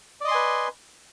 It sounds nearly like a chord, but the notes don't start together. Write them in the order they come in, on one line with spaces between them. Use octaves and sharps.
D5 D#5 C6 G#5 B4